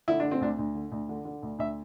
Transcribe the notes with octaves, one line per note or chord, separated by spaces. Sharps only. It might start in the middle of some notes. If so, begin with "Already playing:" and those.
D3 E4
D4
D3
C4
D2 D4
D2
D3
D2
D3
D3
D2
D2 E5